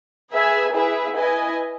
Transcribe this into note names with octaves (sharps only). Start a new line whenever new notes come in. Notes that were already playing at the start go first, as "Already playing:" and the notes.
G#4 B4 E5 G#5
E4 G#4 B4 E5
E4 B4 D#5 G#5